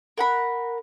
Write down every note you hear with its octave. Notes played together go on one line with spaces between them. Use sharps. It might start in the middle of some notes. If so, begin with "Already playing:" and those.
A#4 F#5 B5